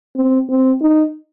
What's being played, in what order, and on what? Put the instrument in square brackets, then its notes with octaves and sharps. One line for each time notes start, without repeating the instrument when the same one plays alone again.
[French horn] C4
C4
D#4